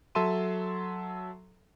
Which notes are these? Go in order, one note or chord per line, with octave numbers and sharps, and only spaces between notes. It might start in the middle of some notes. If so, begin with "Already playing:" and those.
F#3 A4 E5 A5 C6 D#7